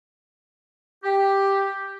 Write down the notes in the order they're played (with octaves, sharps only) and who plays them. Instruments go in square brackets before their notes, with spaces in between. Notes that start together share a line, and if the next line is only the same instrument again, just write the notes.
[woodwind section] G4